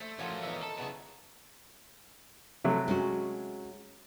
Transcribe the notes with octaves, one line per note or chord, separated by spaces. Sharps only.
A3 C5 E5
F3 A#3 C#4 F#4 G4 A4 C5 G#5
B3 D#4 F4 C5 E5
A4 A5
C#3 B3 E4 G#4 C#5
C3 F#3 A3
G#3 C#4 F#4